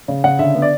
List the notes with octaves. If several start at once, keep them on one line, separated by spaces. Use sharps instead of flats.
C#3
C#3 F#5
D3 E5
B3
D5